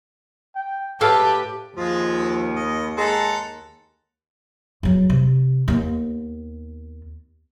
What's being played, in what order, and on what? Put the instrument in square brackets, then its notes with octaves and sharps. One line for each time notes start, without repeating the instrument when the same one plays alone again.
[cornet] G5
[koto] A2 A4 F5 [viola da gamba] G4 B4 [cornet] A5
[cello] D#2 [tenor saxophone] F3 [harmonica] G#3 F4
[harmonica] D#5
[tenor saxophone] G#3 [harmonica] A4 F#5 A#5
[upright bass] E2 F#3
C3
D#2 B3